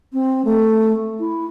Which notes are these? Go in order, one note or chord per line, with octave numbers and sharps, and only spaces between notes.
C4
A3
E4